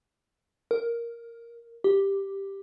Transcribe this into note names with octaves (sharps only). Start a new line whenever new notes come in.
A#4
G4